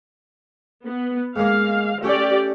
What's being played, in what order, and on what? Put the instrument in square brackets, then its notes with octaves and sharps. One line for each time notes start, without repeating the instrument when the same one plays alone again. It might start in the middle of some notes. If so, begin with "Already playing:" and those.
[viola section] B3
[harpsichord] G#2 G#3 A#3 [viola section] F5
[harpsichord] A3 C#4 [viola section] G4 D5